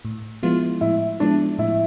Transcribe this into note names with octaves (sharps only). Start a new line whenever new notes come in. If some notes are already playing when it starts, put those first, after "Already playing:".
A2
F3 G#3 B3 E4 F4
A2 E4
F3 G#3 B3 D4 E4
A2 E4